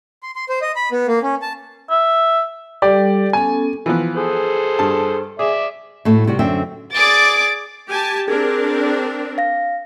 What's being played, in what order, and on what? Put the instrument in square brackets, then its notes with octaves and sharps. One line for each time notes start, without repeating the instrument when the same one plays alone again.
[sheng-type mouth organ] C6
C6
C5
D#5
B5
B3
A#3
C#4
A5
[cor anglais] E5
[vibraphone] G3 A4 [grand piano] G4 D5
[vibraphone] B3 C#4 A4 [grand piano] G#5
[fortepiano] E3 F3 B3
[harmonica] G#4 A4 C5
[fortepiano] G2 A5
[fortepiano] G#4 [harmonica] D5 E5
[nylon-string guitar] A2 A3 F#4
C3 G3 F#4
F#2 D3 C4 E5 G5
[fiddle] G#4 D5 [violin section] D6 A6
[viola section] G4 G#5 A5
[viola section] C4 D4 A#4 [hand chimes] G#4 G#6
[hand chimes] F5 A#6